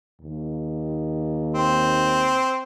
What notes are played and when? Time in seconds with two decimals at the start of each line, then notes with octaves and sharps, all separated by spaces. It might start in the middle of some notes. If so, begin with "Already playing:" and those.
0.20 D#2
1.55 C4